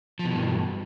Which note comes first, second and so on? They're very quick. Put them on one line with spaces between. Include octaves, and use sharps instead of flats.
F3 B2 E3 G2